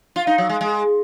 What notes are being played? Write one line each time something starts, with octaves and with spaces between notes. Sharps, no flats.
F4
D#4
F#3
G#3
G#3